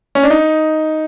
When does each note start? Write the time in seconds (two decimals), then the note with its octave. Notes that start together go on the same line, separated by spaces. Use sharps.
0.15 C#4
0.23 D4
0.30 D#4